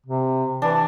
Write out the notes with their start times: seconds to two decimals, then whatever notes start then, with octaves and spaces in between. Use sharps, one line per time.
0.06 C3
0.62 E3 D4